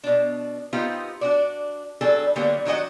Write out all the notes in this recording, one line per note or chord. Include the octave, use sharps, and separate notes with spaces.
B2 D4
B3 C4 D#4 F4 G4
D4 F#4 D5
F#3 G3 D4 G#4 A4
D3 F#3 G3 A#3 B3
D#3 F#3 D4 D#5 F#5